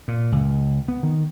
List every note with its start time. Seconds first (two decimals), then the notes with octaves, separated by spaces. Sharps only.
0.08 A#2
0.32 C#2
0.88 B3
1.03 D#3